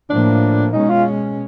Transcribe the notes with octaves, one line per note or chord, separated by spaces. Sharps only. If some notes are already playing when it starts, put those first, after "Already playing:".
A2 F3 A#3 D4
B2 G#3 C#4 D#4
F4